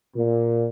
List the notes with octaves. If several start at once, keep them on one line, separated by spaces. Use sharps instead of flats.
A#2